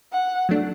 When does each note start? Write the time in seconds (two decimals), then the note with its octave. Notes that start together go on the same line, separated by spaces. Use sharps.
0.12 F#5
0.49 F#3 A3 D4